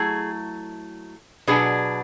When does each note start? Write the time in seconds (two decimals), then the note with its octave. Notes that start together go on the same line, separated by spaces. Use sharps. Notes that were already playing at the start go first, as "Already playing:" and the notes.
Already playing: F#3 A3 E4 G#4
1.47 B2 F#3 B3 D4 G#4